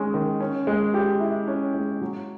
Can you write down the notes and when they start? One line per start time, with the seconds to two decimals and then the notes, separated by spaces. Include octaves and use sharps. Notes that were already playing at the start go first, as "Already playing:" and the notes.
Already playing: D#3 G#3 C#4
0.14 D#3
0.40 C#4
0.67 G#3
0.94 G4
1.20 E4
1.48 C#4
1.74 G#3
2.01 F#3